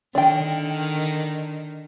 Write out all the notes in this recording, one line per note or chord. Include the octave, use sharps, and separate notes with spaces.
D3 D#3 D4 G5